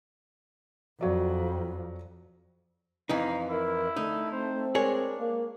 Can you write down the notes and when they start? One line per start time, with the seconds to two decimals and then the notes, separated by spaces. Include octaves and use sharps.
1.01 F2 F#3 D5
3.09 F2 E3 D#4 F5 A#5
3.49 E4 A#4
3.96 D3 A3 D#4
4.32 C4 C5
4.75 G#3 D4 G#4 A#4 C#5
5.19 A#3